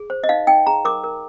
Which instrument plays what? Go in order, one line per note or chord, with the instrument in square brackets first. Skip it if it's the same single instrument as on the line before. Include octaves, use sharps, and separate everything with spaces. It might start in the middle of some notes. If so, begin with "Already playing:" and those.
Already playing: [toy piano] G#4
C5
D#5
D#4 F5
D#4 G5
G#4 A#5
A#4 D6
A#4